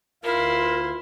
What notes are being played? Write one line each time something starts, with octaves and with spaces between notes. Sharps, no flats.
D2 E4 F4 A#4 F5 C6